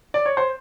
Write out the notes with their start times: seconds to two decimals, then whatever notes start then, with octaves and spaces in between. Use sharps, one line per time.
0.14 D5
0.26 C#5
0.37 C5